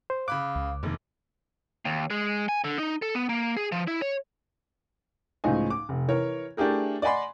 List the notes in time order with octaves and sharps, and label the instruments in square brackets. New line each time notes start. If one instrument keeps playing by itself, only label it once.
[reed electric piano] C5
[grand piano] C#3 B5 F#6 [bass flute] F5 [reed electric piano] D6
[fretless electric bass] C#2
[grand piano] E1 A#3 [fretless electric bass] F2 C3 D#3
[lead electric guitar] D#2
G#3
G#5
D3
D#4
A4
B3
A#3
G#4
F3
E4
C#5
[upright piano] C#2 A2 F3 D#4 G#5
D6
F1
E3 A#4 C#5
A3 D4 E4 G4 G#4 A#4
D5 D#5 F#5 G#5 B5 C6